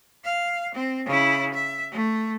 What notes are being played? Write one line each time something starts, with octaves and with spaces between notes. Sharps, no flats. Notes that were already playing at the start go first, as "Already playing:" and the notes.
F5
C4
C#3 E4
E5
A3